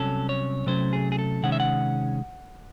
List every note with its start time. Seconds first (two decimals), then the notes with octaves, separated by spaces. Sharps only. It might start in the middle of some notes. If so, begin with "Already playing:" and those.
Already playing: C2 C3 F#3 C#4 A4
0.29 C#5
0.66 C3 F#3 A3 C#4 C5
0.93 G#4
1.12 G#4
1.19 A4
1.43 C3 D#3 G#3 C#4 F#5
1.52 E5
1.60 F#5